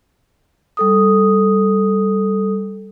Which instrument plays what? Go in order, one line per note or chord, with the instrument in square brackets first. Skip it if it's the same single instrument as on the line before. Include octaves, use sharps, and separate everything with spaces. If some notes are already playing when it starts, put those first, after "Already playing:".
[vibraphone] G3 A4 D#6